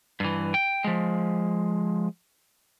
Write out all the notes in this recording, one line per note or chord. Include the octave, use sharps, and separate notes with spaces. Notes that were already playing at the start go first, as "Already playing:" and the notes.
G2 E3
G5
F3 G#3